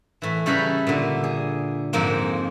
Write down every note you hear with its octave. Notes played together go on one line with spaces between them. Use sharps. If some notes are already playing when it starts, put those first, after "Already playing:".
A2 E3
C#3 G3 E4 A4 B4 A#5
A#2 D3
G#4
F2 G#2 G#3 A#3 C4